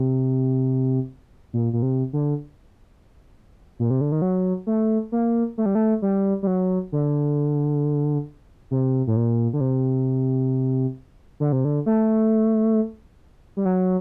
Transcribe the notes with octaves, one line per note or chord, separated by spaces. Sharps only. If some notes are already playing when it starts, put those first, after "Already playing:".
Already playing: C3
A#2
A#2
C3
D3
A#2
C3
D3
D#3
F#3
A3
A#3
A3
G3
A3
G3
G3
F#3
D3
C3
A2
A#2
D3
C3
D3
C3
D3
A3
G3
F#3